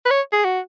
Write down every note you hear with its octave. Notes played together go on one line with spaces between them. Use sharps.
B4
C#5
G#4
F#4